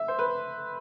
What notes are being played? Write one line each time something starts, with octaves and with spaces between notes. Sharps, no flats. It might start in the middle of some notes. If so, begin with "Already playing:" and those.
Already playing: E5
C5
B4